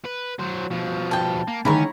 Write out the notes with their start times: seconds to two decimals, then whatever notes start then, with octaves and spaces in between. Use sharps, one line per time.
0.05 B4
0.39 F#3 C5
0.70 B2 F3
1.11 G5 A5
1.48 A#3
1.65 D3 D#3 A3 C#4 E4 A#5 C#6